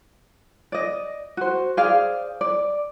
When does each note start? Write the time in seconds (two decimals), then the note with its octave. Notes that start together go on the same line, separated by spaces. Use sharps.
0.72 D5 D#5
1.37 F#4 C5
1.77 G#4 C5 D5 F5
2.41 D5